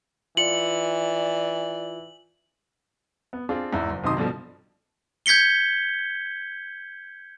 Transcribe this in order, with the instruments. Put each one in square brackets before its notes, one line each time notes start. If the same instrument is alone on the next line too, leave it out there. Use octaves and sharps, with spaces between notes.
[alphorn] E3 [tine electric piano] F4 C#7 [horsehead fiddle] D5 [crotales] F#7
[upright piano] B3
C4 D4 F4 G#4
E2 G#2 E4
F#1
B1 C3 D#3 D#4 C6 D#6
G2 B2 D3 F3
[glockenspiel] G6 G#6 B6 C#7 G7